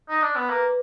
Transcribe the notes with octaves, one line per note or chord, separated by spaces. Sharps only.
D#4
D4
B3
A#3 B4